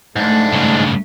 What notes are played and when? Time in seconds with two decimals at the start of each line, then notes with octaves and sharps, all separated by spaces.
0.16 G#2 A3 D4
0.53 G2 C#3